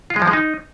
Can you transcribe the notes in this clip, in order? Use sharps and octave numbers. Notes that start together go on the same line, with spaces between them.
F4
G#3
F3
G#3
D#4